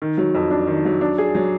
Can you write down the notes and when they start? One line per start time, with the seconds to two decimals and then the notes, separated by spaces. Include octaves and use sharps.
0.02 D#3
0.18 F#3
0.35 F2
0.50 D4
0.67 D#3
0.85 F#3
1.01 D4
1.18 G#4
1.35 F#3